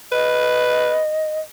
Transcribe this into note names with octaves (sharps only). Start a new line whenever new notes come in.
B4 D#5